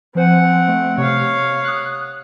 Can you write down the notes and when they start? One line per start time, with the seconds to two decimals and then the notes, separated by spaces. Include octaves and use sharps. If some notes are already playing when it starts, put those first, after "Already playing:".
0.15 F3 C4 C5 F#5 G#5
0.68 A3
0.98 C3 C#5 F5
1.64 D#6 F#6